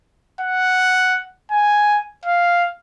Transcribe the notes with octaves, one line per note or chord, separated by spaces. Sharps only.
F#5
G#5
F5